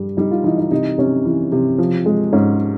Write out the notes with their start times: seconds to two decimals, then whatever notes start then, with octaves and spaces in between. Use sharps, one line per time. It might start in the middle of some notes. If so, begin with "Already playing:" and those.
Already playing: G2 G3
0.17 G3 D#4
0.31 F4
0.44 E3 D#4
0.58 D#4
0.71 C3 D#4
0.98 C3 C#4
1.25 E3
1.52 C3
1.78 F3
2.06 G#3
2.33 G#2 C#4